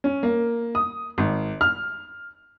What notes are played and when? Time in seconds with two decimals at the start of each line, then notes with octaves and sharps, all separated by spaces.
0.04 C#4
0.23 A#3
0.75 D#6
1.18 G#1
1.61 F6